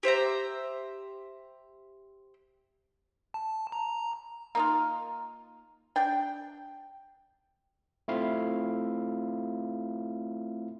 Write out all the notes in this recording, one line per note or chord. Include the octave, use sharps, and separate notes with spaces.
G4 C5 E5 A#5
A5
A#5
A#3 D#4 F4
D4 G5
A3 C4 E4 F4 E5 F5